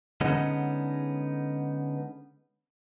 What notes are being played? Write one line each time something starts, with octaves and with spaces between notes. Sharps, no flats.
D3 G#3 B3 C#4 D#4